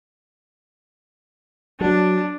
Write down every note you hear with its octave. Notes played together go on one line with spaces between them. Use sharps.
F#3 D4